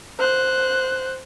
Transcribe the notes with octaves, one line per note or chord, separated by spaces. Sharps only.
C5 F#6